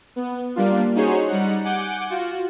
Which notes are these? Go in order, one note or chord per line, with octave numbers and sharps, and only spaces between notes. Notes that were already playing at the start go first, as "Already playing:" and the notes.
B3
G3 A#3 D4 F4
C#4 D#4 F#4 G#4 C5 C#5
G3 D#4 F#5
F#5 G#5 D6 G6
F4 F#4